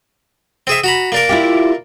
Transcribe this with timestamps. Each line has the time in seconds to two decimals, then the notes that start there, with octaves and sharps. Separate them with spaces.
0.67 C4 G#4 E5
0.84 F#4 A#5 B5
1.12 A#3 D4 A#4
1.29 E4 F4 G4